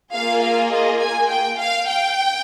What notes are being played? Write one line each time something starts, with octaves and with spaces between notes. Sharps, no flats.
A#3 F4 G#4 F5
F5
D#5
G#5
G5
F5
G5